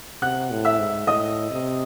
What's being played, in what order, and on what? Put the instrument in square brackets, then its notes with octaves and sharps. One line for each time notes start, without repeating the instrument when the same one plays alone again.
[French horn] C3 [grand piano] F#5 F#6
[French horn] A2
[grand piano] E5 E6
[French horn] G#2
[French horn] A2 [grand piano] D#5 D#6
[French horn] C3